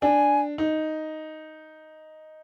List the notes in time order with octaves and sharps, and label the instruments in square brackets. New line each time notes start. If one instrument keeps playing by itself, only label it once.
[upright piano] D4 [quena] G#5
[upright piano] D#4